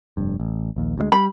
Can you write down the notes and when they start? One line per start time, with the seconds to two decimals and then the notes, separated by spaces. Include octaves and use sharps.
0.17 F1 G2
0.40 A1
0.76 A#1 D#2
0.98 D2 C3 G#3
1.12 G3 B5